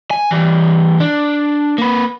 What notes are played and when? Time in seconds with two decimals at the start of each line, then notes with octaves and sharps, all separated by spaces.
0.11 G#5
0.31 E3 G3
1.00 D4
1.78 A#3 B4